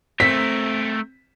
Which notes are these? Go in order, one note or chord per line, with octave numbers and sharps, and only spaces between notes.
A3 C4 A#4 B6